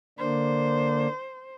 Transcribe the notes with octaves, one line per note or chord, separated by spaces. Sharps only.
D3 A#3 D4 C5